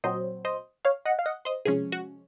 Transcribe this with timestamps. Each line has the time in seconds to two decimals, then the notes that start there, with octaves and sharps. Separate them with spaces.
0.04 A#2 F#3 C4 C5 D#5
0.45 C5 D#5
0.85 C#5 F5
1.05 D#5 F#5
1.19 F5
1.26 D#5 F#5
1.45 C5 D#5
1.65 C2 C3 F3 G#3 C#4 G#4
1.92 F#4